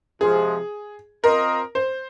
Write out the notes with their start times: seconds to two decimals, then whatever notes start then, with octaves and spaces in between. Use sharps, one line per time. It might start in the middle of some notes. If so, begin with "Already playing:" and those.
0.21 C3 F3 G#3 G#4
1.24 C4 F4 A#4 C5 D#5
1.75 C5